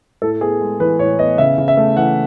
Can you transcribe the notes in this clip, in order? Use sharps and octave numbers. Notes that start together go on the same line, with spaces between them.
A2 A4
B3 G#4
G#3
E3 B4
A2 C#5
B3 D#5
C#3 E5
C#3
E5
A3
E3 F#5